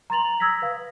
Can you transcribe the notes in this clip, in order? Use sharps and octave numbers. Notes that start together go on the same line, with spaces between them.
A#5 C6 A6 F7 F#7
D#6 E6 G#6 A#6 B6
B4 F5